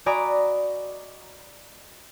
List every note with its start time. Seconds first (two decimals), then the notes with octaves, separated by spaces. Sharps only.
0.06 F#4 D5 D#5 G#5 A#5 B5